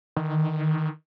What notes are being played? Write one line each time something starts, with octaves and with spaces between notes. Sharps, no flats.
D#3